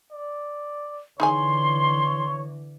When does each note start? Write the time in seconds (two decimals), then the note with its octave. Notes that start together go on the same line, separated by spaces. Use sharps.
0.12 D5
1.20 D3 E3 D#4 G#4 C#5 G#5 C6